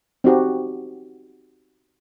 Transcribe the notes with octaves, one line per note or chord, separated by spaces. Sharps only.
C4 D#4 F#4 G4